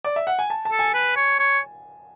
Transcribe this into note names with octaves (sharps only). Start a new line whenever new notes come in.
D5
E5
F#5
G#5
A5
A5
A4
G#5
B4
C#5
C#5